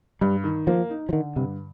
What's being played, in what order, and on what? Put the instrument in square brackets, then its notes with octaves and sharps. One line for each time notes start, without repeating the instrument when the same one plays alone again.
[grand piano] G2 [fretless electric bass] G3
[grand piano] D#3
[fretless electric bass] F3 [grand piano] A#3
[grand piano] D#4
[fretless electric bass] F3
[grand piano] D3 [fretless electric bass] D#3
[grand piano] G2 [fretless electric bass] C3